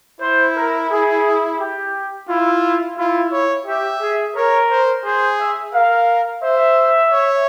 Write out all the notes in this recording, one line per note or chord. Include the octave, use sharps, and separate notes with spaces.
E4 C5
A#4
G#4
G4
E4 F4
E4 F4
C#5
G4 E5
G#4
A#4 C#5
C5
G#4 C5
E5
A#4 F5
C5 E5
C#5